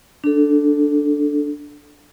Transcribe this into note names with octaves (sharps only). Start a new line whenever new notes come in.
D4 A4